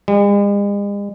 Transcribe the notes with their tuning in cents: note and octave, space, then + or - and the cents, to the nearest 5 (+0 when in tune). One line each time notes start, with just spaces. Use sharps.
G#3 -45